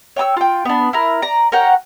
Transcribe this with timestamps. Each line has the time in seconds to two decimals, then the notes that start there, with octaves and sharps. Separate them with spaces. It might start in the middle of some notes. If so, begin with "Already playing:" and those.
0.16 C#5 G5 D#6 E6
0.37 F4 G5
0.65 B3 D4
0.93 E4 A#4
1.22 D5 A#5
1.52 A#4 C#5 F#5 G5